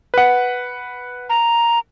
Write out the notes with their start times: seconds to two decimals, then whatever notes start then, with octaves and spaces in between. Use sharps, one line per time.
0.14 B4 F#5
1.30 A#5